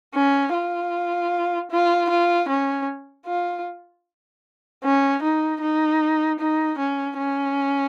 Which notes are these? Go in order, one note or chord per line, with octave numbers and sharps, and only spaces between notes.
C#4
F4
F4
F4
C#4
F4
C#4
D#4
D#4
D#4
C#4
C#4